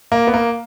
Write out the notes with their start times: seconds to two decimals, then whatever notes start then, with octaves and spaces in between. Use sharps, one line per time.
0.12 A#3
0.27 B3
0.34 A#3